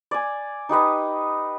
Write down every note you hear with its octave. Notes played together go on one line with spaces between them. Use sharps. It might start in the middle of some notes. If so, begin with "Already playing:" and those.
D5 G#5
D#4 G4 B4 D#5